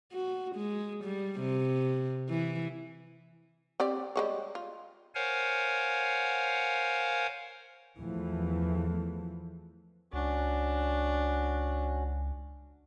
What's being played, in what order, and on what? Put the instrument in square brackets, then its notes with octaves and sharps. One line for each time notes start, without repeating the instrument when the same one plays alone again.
[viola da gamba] F#4
G#3
G3
C3
E3
[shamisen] C4 G4 D5
G3 G#3 C#5
F4
[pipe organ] A#4 C5 C#5 F5 F#5 G#5
[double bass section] E2 E3 F3 A3
[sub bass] C#2 [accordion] C#4 F#4 [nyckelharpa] D4